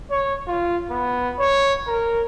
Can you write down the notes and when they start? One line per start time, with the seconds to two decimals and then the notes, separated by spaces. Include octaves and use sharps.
0.11 C#5
0.48 F4
0.90 B3
1.39 C#5
1.87 A#4